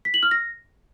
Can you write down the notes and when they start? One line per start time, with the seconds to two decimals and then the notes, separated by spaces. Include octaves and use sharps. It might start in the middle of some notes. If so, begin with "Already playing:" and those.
0.05 B6
0.14 F#7
0.23 F6
0.31 A#6